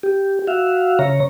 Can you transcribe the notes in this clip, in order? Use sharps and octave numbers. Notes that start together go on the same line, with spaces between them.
G4
F#4 E5 F5
C#3 C#5 A#5